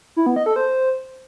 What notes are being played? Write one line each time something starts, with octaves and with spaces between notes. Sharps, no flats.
E4
B3
D#5
A4
C5